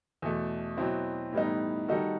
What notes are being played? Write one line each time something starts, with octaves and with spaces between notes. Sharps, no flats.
E2 B2 A3
B2 F#3 C4 E4
A2 E3 G3 B3 D#4
D#3 G3 D#4 F#4 A4